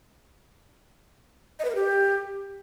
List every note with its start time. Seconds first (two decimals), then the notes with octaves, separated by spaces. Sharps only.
1.59 D#5
1.65 B4
1.70 A#4
1.75 G4